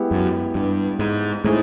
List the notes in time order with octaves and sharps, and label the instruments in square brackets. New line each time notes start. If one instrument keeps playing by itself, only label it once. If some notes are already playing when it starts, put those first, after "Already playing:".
Already playing: [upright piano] G#3 B3 E4 G4
[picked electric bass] F#2
G2
G#2
[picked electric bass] A2 [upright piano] G#3 C4 D#4 G#4